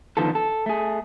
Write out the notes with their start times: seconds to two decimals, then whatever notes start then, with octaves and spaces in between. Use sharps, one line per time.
0.17 D3 D#3 F3 B3 F4 A4
0.35 A4
0.66 A3 G#4